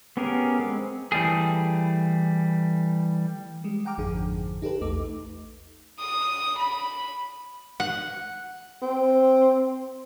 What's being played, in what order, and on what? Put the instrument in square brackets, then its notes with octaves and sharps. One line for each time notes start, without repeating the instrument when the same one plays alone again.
[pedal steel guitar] B3 C#4 G4 G#4 A#4
G#3 C4
[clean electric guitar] E3 G3 A3 G#4
[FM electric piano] G3 G#3
F#5 G5 A#5 D6 F6
G#1 F2 D3 F3 G#4
D#4 G4 A4 B4
A#1 E2 A3 D#4 D6
[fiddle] D#6
B5
[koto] F#5
[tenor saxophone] C4